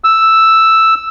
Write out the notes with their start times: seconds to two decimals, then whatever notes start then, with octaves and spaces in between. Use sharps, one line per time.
0.04 E6